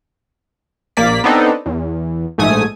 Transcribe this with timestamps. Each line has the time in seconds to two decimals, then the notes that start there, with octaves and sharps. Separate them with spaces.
0.97 A#1 A#3 D5 B6
1.24 B3 C4 D4 D#4 A4
1.66 E2
2.38 A#1 G#2 A3 G#5 D#6